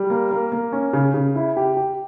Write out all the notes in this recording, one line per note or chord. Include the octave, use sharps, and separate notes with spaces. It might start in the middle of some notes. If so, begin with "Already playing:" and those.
Already playing: G3
A#3
A#3
A#3
C#4
C#3
C#3
E4
G4
G4